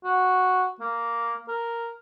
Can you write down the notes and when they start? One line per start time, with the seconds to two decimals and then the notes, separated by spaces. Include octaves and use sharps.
0.04 F#4
0.80 A#3
1.48 A#4